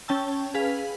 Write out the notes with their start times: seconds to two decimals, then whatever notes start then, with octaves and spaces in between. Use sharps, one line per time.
0.08 C#4 G5 A5 E6
0.54 G#4 B4 F5 B5